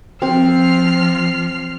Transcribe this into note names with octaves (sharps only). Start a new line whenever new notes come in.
F3 C4 C5 F6 C7